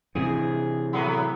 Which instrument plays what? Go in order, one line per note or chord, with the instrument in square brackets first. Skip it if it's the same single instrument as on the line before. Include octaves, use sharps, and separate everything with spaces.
[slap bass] C3 E3 [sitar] G#4
[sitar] A2 F#3 B3